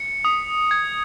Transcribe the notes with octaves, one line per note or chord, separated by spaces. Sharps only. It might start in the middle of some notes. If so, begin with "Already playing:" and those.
Already playing: C#7
D#6
G#6